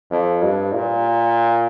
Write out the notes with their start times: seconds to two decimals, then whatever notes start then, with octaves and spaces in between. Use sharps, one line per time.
0.10 F2
0.42 G2
0.74 A#2